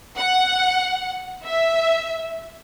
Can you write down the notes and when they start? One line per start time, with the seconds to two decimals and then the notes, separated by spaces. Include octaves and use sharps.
0.18 F#5
1.45 E5